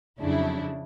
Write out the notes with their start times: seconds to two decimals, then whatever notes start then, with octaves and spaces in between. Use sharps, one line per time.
0.19 F2 C#3 F#3 D4 E4